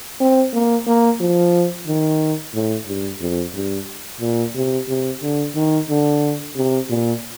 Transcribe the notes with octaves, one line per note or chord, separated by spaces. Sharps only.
C4
A#3
A#3
F3
D#3
A2
G2
F2
G2
A#2
C3
C3
D3
D#3
D3
C3
A#2